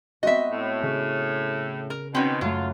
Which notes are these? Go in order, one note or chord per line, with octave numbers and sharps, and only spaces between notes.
B3 C4 F#4 D#5 E5
A2
C#3
A#4
B2 D#3 C4 C#4
F#2 F#3 A3 F4